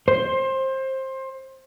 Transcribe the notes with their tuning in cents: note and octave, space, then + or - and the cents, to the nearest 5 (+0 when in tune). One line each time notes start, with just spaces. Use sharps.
C5 +20